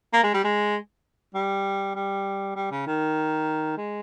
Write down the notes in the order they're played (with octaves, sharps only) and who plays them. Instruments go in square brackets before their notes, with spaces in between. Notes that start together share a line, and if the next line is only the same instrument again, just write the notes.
[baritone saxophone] A#3
G#3
G3
G#3
G3
G3
G3
C#3
D#3
G#3